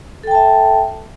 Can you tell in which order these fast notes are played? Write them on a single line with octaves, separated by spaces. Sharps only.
A4 G5 A5 E5